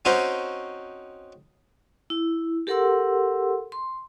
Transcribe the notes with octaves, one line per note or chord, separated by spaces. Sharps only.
C4 C#4 D#4 F#4 C5
E4
G4 A4 A#4 F#5 C6 E6
C6